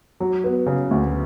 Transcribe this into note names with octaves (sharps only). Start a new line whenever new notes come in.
F#3
B3
C#3
D2